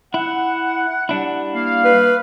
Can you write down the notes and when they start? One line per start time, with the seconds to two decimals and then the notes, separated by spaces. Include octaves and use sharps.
0.14 E4 F#5
1.09 G3 D4 E4
1.53 A#3 F5
1.84 B4